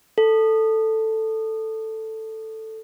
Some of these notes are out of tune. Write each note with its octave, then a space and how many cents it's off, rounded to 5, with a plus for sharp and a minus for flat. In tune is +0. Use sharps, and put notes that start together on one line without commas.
A4 +5